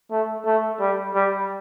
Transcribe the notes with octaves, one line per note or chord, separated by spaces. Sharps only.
A3
A3
G3
G3